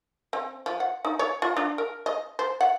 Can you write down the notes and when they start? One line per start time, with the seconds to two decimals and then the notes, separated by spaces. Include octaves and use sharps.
0.33 C4
0.66 F3
0.80 F#5
1.05 D#4
1.19 C#5
1.42 F4
1.57 D4
1.78 A#4
2.06 D#5
2.39 C5
2.61 F#5